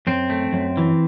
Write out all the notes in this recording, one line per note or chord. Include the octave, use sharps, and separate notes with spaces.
F#2 C4
A3
F#2
E3